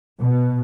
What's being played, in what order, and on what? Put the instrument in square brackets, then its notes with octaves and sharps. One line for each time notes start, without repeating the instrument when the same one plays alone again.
[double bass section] B2